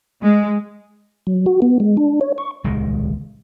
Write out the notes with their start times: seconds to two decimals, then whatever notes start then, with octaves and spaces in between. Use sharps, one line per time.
0.22 G#3
1.27 F#3
1.46 F#4
1.62 B3
1.80 G#3
1.97 D4
2.21 C#5
2.38 C#6
2.64 D#1 C#2 D#3 G#3